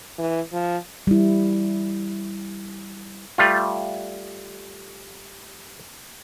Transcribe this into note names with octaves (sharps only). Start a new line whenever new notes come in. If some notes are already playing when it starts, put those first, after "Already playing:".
E3
F3
G3 E4
G3 A3 F4